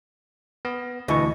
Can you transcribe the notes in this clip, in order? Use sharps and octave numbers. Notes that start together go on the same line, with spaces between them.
B3
D2 B2 E3 C#6